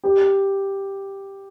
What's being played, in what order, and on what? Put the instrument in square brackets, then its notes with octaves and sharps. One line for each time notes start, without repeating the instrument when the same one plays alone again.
[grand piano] G4